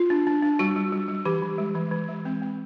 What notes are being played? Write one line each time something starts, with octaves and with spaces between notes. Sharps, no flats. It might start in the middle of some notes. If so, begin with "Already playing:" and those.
Already playing: F4
D4
D4
D4
G3 F#4
G3
G3
G3
E3 G4
E3
G#3
E3
E3
G#3
C4
C4